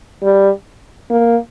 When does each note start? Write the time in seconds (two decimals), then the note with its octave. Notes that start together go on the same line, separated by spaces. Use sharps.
0.23 G3
1.10 A#3